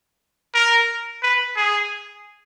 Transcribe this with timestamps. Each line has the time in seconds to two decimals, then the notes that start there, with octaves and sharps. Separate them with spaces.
0.54 A#4
1.22 B4
1.57 G#4